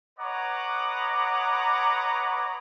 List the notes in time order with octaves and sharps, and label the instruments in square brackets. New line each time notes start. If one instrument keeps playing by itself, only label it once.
[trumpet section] B4 C#5 D#5 F#5 A#5 D6